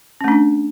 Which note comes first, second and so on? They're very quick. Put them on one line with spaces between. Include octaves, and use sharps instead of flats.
C#4 A3 D4